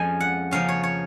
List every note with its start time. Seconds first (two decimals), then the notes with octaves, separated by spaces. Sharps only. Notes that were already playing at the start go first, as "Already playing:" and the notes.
Already playing: F2 F3 G#3 C#4 G#5
0.20 F#5
0.51 C#3 F3 A#3 C#4 F5
0.68 C#5
0.83 C#5